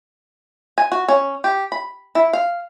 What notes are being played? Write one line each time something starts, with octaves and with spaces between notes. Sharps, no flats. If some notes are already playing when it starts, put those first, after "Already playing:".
G#5
F#4
C#4
G4
B5
E4
F5